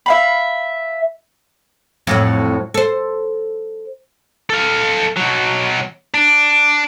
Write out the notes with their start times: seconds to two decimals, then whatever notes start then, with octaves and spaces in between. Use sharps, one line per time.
0.06 E5 F5 B5
2.07 F2 A2 F#3
2.74 A4 C5
4.50 A4 F5
5.16 B2 F#3
6.14 D4